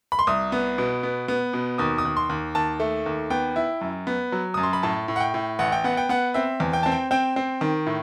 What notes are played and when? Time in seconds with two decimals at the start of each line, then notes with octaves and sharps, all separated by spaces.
0.12 B5
0.19 C6
0.27 C2 D#6
0.52 B3
0.78 B2
1.03 B3
1.28 B3
1.53 B2
1.78 D#2 D#6
1.98 D#6
2.05 D#2
2.17 C6
2.29 D#2
2.55 D#2 A5
2.80 A3
3.06 D#2
3.30 B3 G5
3.56 E4
3.81 F#2
4.07 B3
4.32 F#3
4.54 F#2 D#6
4.63 C6
4.73 B5
4.83 A2 A5
5.08 A2
5.16 F#5
5.20 G5
5.34 A2
5.59 A1 F#5
5.72 G5
5.84 B3 F#5
5.97 G5
6.09 B3 F#5
6.34 C4 E5
6.60 E2
6.73 G5
6.83 C4 A5
6.92 G5
7.11 C4 G5
7.36 C4
7.61 D#3
7.86 A2